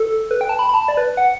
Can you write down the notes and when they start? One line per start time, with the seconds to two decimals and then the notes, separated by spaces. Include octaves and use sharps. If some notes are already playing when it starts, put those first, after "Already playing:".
Already playing: A4
0.31 B4
0.41 G5
0.49 A5
0.59 B5
0.69 B5
0.74 A5
0.88 D5
0.97 B4
1.17 F#5